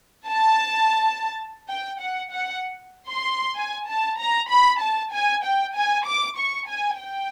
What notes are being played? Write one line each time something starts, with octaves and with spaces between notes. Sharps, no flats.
A5
G5
F#5
F#5
C6
G#5
A5
A#5
B5
A5
G#5
G5
G#5
D6
C#6
G#5
G5